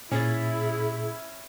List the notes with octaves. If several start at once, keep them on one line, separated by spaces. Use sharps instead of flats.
A#2 C#4 E4 G#4 A6